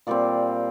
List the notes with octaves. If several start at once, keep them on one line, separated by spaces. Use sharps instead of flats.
A#2 G3 C4 D5